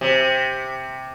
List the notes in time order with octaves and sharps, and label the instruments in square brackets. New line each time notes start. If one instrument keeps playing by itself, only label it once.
[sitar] C3